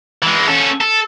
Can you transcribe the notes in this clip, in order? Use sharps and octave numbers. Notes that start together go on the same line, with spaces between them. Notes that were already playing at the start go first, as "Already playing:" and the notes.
E3 G#3
C#4 A4
A4